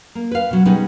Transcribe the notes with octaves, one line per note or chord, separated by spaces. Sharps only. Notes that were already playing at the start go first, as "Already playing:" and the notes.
A#3
B4 F5
B2 F#3
B2 G3 G#3 B3 C#4 D#4